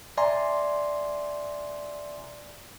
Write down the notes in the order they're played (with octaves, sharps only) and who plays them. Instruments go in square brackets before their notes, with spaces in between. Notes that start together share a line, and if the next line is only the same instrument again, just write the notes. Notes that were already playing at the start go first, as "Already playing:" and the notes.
[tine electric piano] D5 E5 G#5 A#5 C6